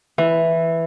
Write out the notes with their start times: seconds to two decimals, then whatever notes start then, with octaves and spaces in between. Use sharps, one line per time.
0.18 E3